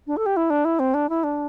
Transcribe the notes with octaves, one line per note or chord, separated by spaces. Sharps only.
D4
A4
G4
E4
D4
E4
C4
D4
E4
D4